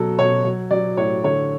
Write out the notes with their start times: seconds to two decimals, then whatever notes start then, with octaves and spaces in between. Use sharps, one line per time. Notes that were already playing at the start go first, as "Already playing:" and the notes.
Already playing: B2 F#3 A4
0.19 B2 C#5
0.44 F#3
0.71 F#3 D5
0.97 A2 C#5
1.24 D3 C#5